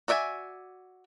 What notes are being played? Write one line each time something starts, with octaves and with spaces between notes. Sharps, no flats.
F#4 D5 E5 G5 G#5